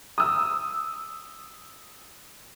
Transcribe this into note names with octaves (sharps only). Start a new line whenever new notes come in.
D#6 E6